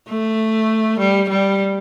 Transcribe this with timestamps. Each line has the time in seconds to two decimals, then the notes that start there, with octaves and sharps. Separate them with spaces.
0.09 A3
0.99 G3
1.29 G3